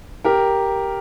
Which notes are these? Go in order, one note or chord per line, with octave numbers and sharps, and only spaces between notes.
G4 A#4